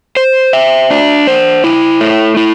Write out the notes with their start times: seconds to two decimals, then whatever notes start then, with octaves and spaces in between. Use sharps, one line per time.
0.17 C5
0.53 E5
0.90 D4
1.27 C5
1.64 E4
2.01 A3
2.37 E4